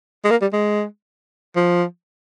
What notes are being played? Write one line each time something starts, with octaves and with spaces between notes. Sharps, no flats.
G#3
A#3
G3
G#3
F3